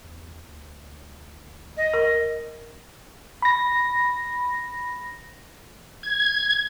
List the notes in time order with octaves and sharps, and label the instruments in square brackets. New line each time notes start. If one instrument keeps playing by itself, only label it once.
[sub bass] E2
D2
[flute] D#5
[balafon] A#4
[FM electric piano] B5 A#6
[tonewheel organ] G#6